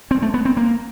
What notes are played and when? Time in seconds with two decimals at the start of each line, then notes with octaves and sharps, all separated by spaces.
0.11 C4
0.22 A3
0.34 B3
0.45 C4
0.57 A#3